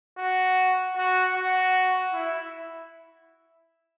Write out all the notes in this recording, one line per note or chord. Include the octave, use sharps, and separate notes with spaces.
F#4
F#4
F#4
E4